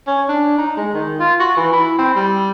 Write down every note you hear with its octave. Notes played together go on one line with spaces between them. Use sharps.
C#4
D4
D#4
G#3
D#3
F4
F#4
E3
E4
C4
G3